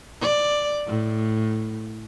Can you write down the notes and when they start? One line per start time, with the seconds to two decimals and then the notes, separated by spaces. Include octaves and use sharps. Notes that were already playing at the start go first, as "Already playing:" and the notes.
0.21 D5
0.87 A2